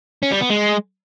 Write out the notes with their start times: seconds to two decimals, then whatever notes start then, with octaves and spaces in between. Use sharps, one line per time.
0.23 C#4
0.32 G3
0.41 B3
0.50 G#3